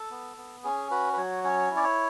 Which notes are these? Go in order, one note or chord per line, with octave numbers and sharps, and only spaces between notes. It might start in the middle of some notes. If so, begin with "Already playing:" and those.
Already playing: A4
B3
B3
C#4 G#4
F#4 B4
B4
F#3 C#5
C#4 C#5
E4
D5
C#5